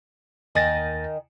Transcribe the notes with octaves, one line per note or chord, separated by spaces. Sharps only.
D#2 D#3 D#5 G#5 A6 A#6